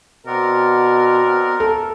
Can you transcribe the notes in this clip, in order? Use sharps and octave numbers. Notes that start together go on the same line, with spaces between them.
B2 C4 A#4 D5 F#5
A4